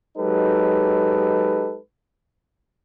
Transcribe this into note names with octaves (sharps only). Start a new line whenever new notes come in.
F#3 G#3 D#4 G4 A4 B4